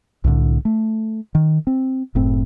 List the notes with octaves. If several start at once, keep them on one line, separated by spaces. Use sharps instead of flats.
C2 A2 D3
A3
D#3
C4
F#1 A2 C4